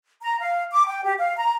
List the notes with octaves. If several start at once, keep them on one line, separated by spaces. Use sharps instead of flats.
A#5
F5
D6
G5
G4
F5
A#5